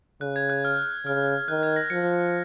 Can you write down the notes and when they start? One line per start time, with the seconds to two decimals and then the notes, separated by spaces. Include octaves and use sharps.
0.21 C#3 F#6
0.36 G#6
0.50 F#6
0.65 F6
1.06 C#3 F6
1.48 D#3 F#6
1.63 G#6
1.76 A#6
1.90 F3 C#7